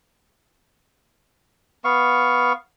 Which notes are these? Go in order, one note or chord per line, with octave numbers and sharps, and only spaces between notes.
B3 F5 C#6